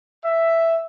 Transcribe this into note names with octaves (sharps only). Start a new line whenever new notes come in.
E5